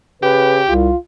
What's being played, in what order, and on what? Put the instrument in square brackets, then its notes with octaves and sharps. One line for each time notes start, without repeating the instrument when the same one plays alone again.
[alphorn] C#3 [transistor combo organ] G4 [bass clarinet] B4
[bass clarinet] C2 [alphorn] F4